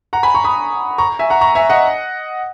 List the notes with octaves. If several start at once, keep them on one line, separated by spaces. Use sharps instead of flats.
F#5 A#5
G#5 B5
A#5 C#6
B5 D#6
A#5 C#6
E5 G#5
F#5 A#5
A#5 C#6
E5 G#5
D#5 F#5